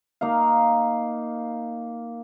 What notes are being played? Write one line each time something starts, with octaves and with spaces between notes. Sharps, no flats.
A#3 D#4 F5